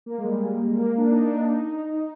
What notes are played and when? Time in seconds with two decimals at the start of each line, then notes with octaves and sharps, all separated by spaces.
0.06 A#3
0.18 G#3
0.24 G3
0.79 A#3
0.98 D4
1.11 D#4
1.25 D4
1.53 D#4
1.71 D#4
1.90 D#4